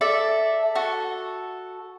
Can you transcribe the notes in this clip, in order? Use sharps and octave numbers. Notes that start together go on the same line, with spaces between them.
A4 D5 E5
F#4 A4